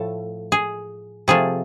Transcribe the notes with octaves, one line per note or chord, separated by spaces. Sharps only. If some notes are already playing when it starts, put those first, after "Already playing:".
Already playing: A2 F3 A3 A4
G#4
C3 F3 A3 G#4